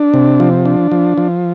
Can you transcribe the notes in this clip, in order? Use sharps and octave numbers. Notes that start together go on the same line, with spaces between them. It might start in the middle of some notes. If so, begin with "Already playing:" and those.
Already playing: D4
C3
F3
D4
F3
F3